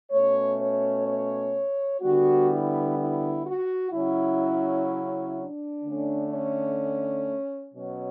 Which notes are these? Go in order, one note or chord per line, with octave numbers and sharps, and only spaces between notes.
B2 A3 C#4 C#5
C#5
C#5
D3 G3 B3 F#4
E4
E4
F#4
C#3 F#3 C#4 E4
D4
D3 A3 C#4
C#4
B2 F#3 C#4